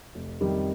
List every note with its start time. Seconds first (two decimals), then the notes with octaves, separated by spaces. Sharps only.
0.15 F1
0.41 F2 C3 D#3 G3